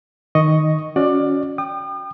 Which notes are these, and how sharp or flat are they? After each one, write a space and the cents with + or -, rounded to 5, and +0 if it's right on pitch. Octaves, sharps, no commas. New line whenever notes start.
D#3 +0 D#5 +0 C#6 +0
C#4 +15 F#4 -15 D5 +20
G5 +0 D#6 -45